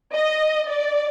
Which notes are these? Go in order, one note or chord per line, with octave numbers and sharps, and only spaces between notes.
D#5
D5